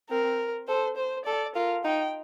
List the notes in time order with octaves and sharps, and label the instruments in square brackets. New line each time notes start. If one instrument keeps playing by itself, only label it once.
[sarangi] C4 [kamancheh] A#4
[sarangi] A4 [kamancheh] C5
[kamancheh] C5
[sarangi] A4 [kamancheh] D5
[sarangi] F4 [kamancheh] A#4
[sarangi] D#4 [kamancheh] G5